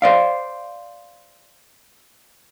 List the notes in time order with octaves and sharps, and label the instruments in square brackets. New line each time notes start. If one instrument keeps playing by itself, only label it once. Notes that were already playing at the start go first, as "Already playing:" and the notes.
[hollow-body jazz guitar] C5 D5 F5